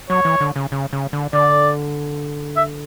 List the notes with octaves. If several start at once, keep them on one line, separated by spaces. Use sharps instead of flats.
F#3 C#5
E3
D3
C#3
C#3
C#3
D3
D3 D5
E5